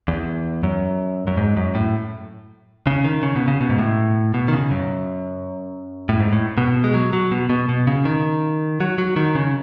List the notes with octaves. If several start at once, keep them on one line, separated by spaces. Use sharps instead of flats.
E2
F#2
F#2
G#2
F#2
A2
C#3
D#3
C#3
B2
C#3
B2
G#2
A2
B2
D#3
C#3
F#2
A2
G#2
A2
B2
G#3
F#3
F#3
B2
B2
B2
C#3
D#3
F#3
F#3
D#3
C#3